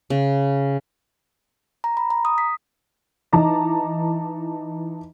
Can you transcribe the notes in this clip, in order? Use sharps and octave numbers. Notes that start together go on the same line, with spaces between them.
C#3
A#5
B5
A#5
D#6
B6
E3 D#4 A5 A#5 D6